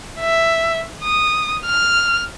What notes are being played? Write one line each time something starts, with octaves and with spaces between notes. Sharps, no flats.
E5
D#6
F6